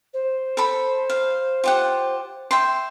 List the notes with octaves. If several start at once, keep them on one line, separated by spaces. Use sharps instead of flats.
C5
A4 B5
F5
F4 G4 F#5
E5 G5 C6